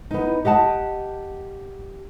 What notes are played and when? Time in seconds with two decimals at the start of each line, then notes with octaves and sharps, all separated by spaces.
0.11 B3 D#4
0.45 G4 D#5 F#5 A5